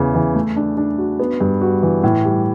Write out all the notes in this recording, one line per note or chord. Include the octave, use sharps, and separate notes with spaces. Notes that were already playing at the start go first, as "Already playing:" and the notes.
Already playing: E2 C#3 E3
E3
A3
D4
D4
F#4
B3
G2
F#4
E3
A2
G3